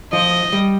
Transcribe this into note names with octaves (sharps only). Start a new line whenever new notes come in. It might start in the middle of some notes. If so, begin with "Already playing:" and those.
F3 D#5
G3